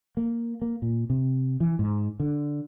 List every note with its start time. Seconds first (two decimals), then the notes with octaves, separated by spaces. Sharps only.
0.17 A#3
0.62 A#3
0.82 A#2
1.10 C3
1.60 E3
1.79 G#2
2.20 D3